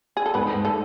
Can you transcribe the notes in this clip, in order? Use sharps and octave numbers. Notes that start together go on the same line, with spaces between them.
G#4
A4
G#2 B3 B4
G#2
A3 A4